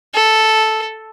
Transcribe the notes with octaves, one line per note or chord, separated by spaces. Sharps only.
A4